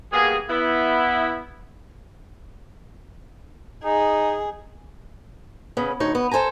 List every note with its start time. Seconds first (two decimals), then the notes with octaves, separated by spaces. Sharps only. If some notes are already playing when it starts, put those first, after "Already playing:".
0.12 G2 A#3 B3 G#4
0.49 B3 E4
3.84 D#4 G#4
5.77 C#3 B3 C#4
6.00 D2 D#4 C#5
6.15 B3
6.31 A4 C5 G#5 A#5